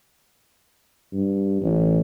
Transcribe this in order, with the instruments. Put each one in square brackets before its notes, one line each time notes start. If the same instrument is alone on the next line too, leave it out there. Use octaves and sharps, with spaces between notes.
[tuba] G2
A1